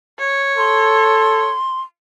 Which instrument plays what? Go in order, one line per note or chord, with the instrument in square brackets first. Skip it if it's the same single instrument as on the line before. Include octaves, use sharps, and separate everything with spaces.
[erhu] C#5
[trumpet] A4 [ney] C6